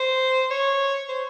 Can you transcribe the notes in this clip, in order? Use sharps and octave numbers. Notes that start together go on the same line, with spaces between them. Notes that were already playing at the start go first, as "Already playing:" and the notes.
Already playing: C5
C#5
C5